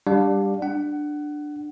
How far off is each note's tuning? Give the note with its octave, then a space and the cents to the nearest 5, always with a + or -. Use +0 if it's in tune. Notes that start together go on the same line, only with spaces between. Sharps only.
G3 +10 D4 +0 F5 +30
D4 +10 F#5 +20